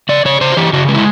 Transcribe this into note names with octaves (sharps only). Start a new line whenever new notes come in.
C#3 D5
C#3 C#5
C#3 C5
F#4
E3 G4
C#3 F#4
G#3
E4